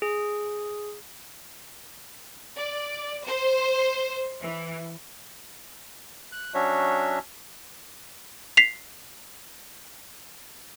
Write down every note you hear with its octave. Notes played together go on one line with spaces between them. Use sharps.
G#4
D5
C5
E3
F#6
F#3 C#4 D4 F#4 C#5 E5
B6 C7 F7